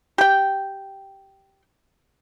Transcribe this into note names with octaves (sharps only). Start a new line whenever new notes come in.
G4 G5